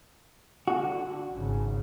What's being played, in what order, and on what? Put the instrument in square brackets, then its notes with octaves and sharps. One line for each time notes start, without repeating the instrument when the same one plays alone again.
[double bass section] D3 [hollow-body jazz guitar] F#4
[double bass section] G#1 C#3